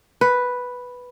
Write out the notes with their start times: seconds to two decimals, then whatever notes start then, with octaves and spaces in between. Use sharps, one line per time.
0.21 B4